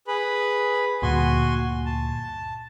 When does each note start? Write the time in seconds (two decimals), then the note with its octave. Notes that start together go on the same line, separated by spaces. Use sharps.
0.08 G#4 B4 B5
1.02 D2 G2 A#2 F#4 G#5 C6
1.86 A5